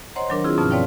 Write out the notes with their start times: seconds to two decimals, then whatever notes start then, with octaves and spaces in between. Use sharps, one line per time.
0.16 C5 C#5 D#5 F#5 A#5 C6
0.29 D#3 F#3 D4 A#4
0.44 C4 D4 E4 F4 G#4
0.58 G2 B2 F3 C#4 A5 F6
0.71 C4 B4 C#5 D5 F5 G5